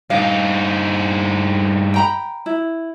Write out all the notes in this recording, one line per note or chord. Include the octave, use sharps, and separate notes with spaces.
G2 D#4 F5
G5 A#5 B5
E4